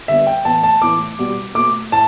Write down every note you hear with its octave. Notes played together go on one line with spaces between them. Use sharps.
D3 G3 B3 E5
G5
A2 E3 B3 A5
A5
A2 E3 B3 D6
B2 G3 B3
B2 A3 D6
A2 A5